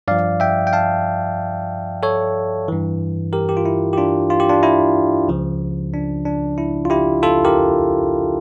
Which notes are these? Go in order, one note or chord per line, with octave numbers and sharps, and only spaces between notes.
G2 F3 D5 F5
E5 G5
G5
F5 A5
A4 C#5
G2 E3
G4 A#4
G4
F4
E4
G4
D4 F4
F4
G4
D4 F4
E4
C#2 C#3 F3
D4
D4
E4
F4
E4 G4
F4 A4
G4 A#4